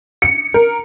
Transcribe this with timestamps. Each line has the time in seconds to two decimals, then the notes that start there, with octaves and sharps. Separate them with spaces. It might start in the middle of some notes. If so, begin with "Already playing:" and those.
0.22 C#7
0.54 A#4